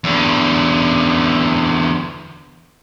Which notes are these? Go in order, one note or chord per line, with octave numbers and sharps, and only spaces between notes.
E2 D3